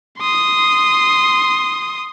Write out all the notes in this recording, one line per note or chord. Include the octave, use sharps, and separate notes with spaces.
C6 D#6